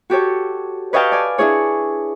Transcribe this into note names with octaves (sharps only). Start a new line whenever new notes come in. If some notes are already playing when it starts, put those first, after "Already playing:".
F#4 G4 A4 C#5
B4 C#5 D#5 F5 G5 A5
D5 G#5
D4 E4 G#4 C#5